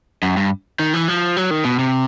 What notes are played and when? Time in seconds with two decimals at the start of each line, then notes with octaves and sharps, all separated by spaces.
0.23 F#2
0.37 G2
0.79 D#3
0.93 E3
1.08 F3
1.37 F#3
1.51 D#3
1.65 B2
1.79 C3